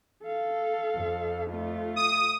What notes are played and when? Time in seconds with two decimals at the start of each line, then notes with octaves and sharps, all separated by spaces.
0.23 A4 F5
0.96 F2
1.50 A3 F4
1.96 D#6